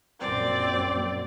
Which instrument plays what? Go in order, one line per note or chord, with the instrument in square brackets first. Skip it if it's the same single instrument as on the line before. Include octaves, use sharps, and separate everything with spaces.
[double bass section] A#1 F#2 [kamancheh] C4 D5